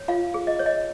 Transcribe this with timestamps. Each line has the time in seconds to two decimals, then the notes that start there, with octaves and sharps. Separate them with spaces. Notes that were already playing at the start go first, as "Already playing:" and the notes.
Already playing: C#5
0.08 F4 F5
0.34 G#4
0.47 D#5
0.59 C#5
0.66 D#5